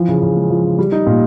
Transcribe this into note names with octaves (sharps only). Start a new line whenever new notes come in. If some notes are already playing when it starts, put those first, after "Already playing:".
Already playing: E3 F3
C#3
C#3
G#3
F3
C#3
G3
D#4
A#2